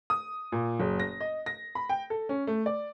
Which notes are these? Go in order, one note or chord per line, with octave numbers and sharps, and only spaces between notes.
D#6
A#2
F#1
A#6
D#5
A#6
B5
G5
A4
C#4
A3
D5